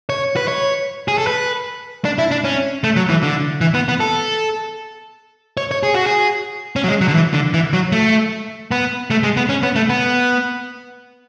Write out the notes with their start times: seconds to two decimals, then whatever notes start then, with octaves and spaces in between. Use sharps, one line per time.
0.09 C#5
0.37 B4
0.48 C#5
1.08 G#4
1.18 A4
1.27 B4
2.05 D4
2.19 E4
2.31 D4
2.44 C#4
2.84 A3
2.96 F#3
3.10 E3
3.23 D3
3.61 E3
3.74 B3
3.88 B3
4.00 A4
5.57 C#5
5.71 C#5
5.83 G#4
5.94 F#4
6.06 G#4
6.76 C#4
6.84 F#3
6.88 G#3
7.01 F#3
7.08 D3
7.14 E3
7.34 D3
7.54 E3
7.73 F#3
7.92 A3
8.71 B3
9.10 A3
9.23 G#3
9.37 B3
9.49 C#4
9.63 B3
9.76 A3
9.89 B3